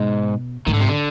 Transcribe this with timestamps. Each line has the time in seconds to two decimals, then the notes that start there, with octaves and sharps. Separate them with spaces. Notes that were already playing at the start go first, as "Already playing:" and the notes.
Already playing: G#2 B2
0.67 G#2 D#3
0.74 D3
0.81 C3
0.89 D3